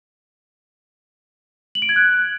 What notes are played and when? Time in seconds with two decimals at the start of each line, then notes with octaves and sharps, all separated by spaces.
1.75 F#7
1.82 D7
1.89 G#6
1.96 F#6